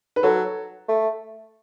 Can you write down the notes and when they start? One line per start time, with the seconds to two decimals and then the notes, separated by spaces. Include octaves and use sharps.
0.16 B4
0.23 F#3 A4
0.88 A3